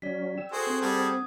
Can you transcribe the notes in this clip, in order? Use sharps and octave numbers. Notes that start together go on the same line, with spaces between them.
F#3 C#4 D5 B6
G5 E6
F#4 G#4 A4 C5 G#5
C4
G3 G#4 A4 F#5 D#6
D#6 G#6